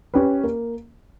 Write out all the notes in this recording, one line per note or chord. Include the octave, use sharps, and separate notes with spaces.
C#4 G4 B4
A#3